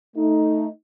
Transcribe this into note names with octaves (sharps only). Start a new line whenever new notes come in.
A3 D#4